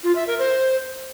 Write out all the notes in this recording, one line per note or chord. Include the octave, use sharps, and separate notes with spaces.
F4
E5
A#4
C5